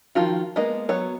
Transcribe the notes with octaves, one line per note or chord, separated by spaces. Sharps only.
D#3 F3 F4 F#4
G#3 A#3 B3 D#5
F#3 B3 C#5